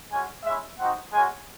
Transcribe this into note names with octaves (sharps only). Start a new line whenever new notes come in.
G#3 C#4 F#4 G#5
G#3 C#4 E4 E5
C4 D#4 F#4 F#5
G#3 C#4 F#4 G#5